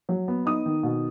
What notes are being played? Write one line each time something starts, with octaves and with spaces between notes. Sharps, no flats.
F#3
B3
D#4 D#6
D#3
B2